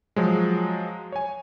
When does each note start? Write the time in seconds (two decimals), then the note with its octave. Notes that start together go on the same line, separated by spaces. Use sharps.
0.16 F3 F#3 G#3
1.12 C#5 G#5